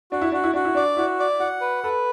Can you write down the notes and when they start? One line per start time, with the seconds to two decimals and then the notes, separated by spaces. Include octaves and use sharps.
0.12 D4 F#4
0.22 E4
0.32 D4 F#4
0.44 E4
0.54 D4 F#4
0.65 E4
0.75 D4 D5
0.97 E4 F#4
1.19 D5
1.40 F#4 F#5
1.61 B4
1.84 A4 B4